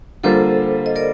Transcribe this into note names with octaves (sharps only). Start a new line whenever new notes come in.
D3 G3 A#3 F4 A4 C5
D#5
A#4 D5